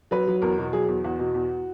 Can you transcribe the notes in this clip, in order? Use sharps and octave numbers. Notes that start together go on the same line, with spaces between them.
F#3 B4
F#3
E2 A#4
B2
F#3 G#4
E2
E2 F#4
B2
E2